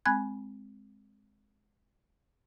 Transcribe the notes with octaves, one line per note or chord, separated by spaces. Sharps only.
G#3 C4 G#5 B5 F#6 G#6